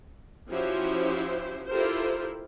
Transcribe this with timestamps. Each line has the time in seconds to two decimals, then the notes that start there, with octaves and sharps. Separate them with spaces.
0.49 F3 C#4 E4 F#4 G4 C5
1.69 E4 F4 G4 A4 A#4 C5